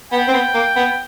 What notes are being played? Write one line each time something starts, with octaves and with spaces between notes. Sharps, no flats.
B3 G5
C4
B3
A#3
B3